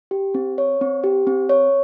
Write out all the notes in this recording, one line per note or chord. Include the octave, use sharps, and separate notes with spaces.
G4
C4
C#5
C4
G4
C4
C#5